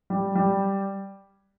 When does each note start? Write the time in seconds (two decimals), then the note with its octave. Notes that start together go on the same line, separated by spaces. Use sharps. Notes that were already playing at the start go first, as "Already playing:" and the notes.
0.10 G3
0.35 G3